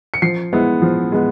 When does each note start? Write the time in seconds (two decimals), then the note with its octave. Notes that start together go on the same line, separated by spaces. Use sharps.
0.14 C#7
0.22 F3 C7
0.53 G#3 B3 E4
0.82 F3
1.12 G#3 B3